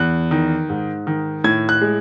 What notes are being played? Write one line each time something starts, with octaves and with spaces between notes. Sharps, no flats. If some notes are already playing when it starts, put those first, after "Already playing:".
Already playing: E2 F#6
D#3
G#2
D#3
A2 G#6
F#6
G#3